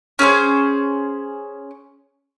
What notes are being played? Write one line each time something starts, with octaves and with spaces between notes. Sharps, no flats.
C#4 G#4 A4 C5